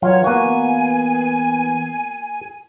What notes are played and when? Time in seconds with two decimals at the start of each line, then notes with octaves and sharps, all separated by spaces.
0.02 E3 F#3 F4 C#5
0.24 A#3 B3 F#4 G#5